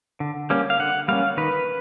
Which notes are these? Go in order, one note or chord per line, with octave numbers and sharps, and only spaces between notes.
D3
G3 A#3 C#4
F5
D3 F#5
G3 A#3 C#4 F5
D#3 B4